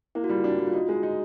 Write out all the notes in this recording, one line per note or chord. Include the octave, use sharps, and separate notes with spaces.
A#3 E4
F#4
G3 F4
D4 F#4
G3
F4
D#4 F#4
G#3
D#4